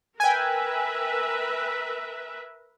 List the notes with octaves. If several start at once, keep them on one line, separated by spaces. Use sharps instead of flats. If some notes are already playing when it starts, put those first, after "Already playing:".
A#4 B4 E5 G5 G#5